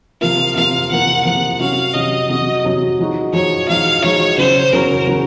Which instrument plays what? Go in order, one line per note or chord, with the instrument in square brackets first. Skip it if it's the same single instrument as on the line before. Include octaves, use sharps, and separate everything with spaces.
[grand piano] C3 F3 A#3 F4 [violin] F5
[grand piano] C3 F3 A#3 F4 [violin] F5
[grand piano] C3 F3 A#3 F4 [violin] F#5
[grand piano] C3 F3 A#3 F4 [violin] F#5
[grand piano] C3 F#3 C#4 F#4 [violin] F5
[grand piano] C3 F#3 C#4 F#4 [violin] D#5
[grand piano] C3 F#3 C#4 F#4 [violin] D#5
[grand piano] C3 F#3 C#4 F#4
F3 G#3 D#4 F#4
[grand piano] F3 G#3 D#4 F#4 [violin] C#5
[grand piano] F3 G#3 D#4 F#4 [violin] F5
[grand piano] F3 G#3 D#4 F#4 [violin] C#5
[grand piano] C#3 F#3 C#4 F#4 [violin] C5
[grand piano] C#3 F#3 C#4 F#4 [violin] A#4
[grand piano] C#3 F#3 C#4 F#4